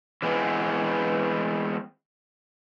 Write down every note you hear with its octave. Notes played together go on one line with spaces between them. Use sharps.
E3 G#3 B3 C4